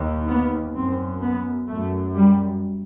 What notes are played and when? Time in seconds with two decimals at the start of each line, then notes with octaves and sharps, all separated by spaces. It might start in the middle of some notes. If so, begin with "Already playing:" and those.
Already playing: D#2
0.28 B3
0.75 F#2 C4
1.21 B3
1.69 F#2 A3
2.15 G3